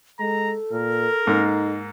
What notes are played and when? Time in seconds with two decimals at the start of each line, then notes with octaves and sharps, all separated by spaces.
0.20 G#3 A4 A#5
0.71 A#2 A#4
1.27 G#2 A#3 D#4